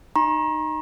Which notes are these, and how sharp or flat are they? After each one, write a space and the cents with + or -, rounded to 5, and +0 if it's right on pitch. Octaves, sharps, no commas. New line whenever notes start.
D#4 -10 A#5 +30 C#6 -45